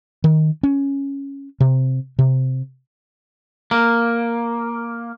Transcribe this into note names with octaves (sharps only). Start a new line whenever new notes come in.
D#3
C#4
C3
C3
A#3